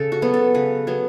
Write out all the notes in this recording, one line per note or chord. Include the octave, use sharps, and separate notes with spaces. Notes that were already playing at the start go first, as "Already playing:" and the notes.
Already playing: C#3 A4
F#4
F#3 B3
A4
C#3 B4
F#3 B3